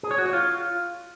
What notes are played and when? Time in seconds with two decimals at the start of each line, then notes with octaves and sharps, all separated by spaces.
0.03 G#4
0.11 C#5
0.18 F#4
0.26 C#5
0.33 F4